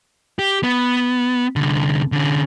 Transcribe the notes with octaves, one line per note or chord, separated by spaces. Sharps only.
G4
B3
C2 D3
D3 C#4